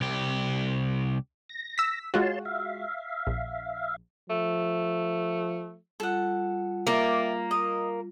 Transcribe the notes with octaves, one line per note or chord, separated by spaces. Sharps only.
C2 G4
A#6
E6 B6
G#3 F4 F#4 C#5 A5 C6
E5 F5
A#1
F3 A3
G3 F4 A4 F#5
A#3 G4 D5 E5
D#5